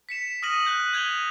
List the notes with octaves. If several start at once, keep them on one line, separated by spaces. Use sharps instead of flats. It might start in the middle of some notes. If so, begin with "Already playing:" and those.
B6 C#7 E7
D#6 F6 A#6 D#7 F#7
F#6 G6
G6 G#6 D#7 F7 G7